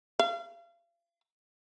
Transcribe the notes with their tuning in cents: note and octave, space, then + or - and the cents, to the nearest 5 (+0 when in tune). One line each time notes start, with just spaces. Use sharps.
F5 -35